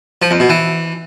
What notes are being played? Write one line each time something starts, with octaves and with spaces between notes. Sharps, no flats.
F3
F2
B2
E3